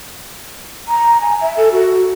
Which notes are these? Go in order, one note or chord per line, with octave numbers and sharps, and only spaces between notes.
A#5
G#5
E5
A4
F#4